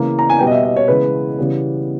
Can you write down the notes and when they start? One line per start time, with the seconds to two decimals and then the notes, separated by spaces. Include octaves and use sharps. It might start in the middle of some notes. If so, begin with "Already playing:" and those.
Already playing: C#3 E3 A#3
0.19 A#5
0.30 G#5
0.39 B2 G3 B3 G5
0.47 D#5
0.52 E5
0.63 D#5
0.76 C#5
0.88 C#3 E3 G#3 B3 B4
1.38 C#3 E3 G3 B3